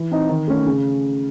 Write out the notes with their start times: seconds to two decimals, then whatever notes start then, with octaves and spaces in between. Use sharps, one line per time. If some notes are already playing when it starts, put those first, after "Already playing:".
Already playing: E3
0.11 C4 D#4
0.29 D#3
0.48 A3 C#4
0.66 C#3